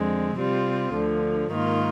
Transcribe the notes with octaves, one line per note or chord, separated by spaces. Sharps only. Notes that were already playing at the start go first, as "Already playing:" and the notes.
Already playing: F2 D3 G#3 C4
C3 G3 C4 F4
D2 D3 F3
G#2 D#3 A#3 F4